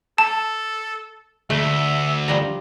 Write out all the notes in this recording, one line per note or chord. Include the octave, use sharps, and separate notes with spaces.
A4 A5
D2 A3 E5
F3 G3 A#5